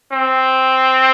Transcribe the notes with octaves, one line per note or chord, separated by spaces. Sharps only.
C4